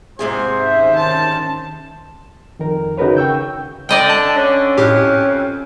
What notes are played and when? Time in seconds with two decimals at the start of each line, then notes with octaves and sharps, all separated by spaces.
0.19 G#2 C3 G#4 C5
0.61 D#3 C#4 E5
0.96 A5
2.59 F2 D#3 A#4
2.97 C#3 D#4 F#4 A#4 B4 C#5
3.17 G5 C#6 E6 G6
3.89 D3 D5 D#5 G5
4.10 A5
4.36 D3 C#4
4.78 F2 A2 G4